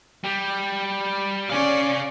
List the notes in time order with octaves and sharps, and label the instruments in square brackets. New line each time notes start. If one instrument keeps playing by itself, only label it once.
[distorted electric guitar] G3
[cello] C#4 D5 [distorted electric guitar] G#4 F5